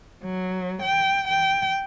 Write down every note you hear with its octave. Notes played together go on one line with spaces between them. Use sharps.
F#3
G5
G5